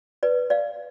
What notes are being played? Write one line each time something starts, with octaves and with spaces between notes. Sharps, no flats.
B4 D5
D5 F5